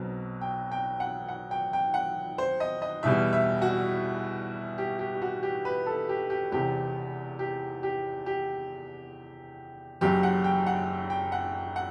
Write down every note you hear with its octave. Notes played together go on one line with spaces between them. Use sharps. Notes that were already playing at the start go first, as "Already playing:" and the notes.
Already playing: B1 B2 F#3 C4
G5
G5
F#5
F#5
G5
G5
F#5
C5
D#5
D#5
E2 B2 G3 E5
E5
F#4
G4
G4
G4
F#4
G4
B4
A4
G4
G4
E1 E2 C3 G4
G4
G4
G4
F#1 F#2 F#3 G4
F#5
G5
F#5
G5
F#5
F#5